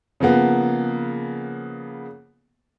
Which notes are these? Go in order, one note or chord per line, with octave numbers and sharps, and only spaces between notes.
C#3 F3 A#3 B3